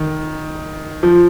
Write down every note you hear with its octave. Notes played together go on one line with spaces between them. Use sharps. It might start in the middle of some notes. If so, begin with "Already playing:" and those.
Already playing: D#3
F3